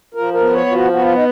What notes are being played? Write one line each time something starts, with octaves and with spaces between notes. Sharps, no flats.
F3 A#4
A#4
B3
C#5
F3
F#4
B3 F#4
F4
D#4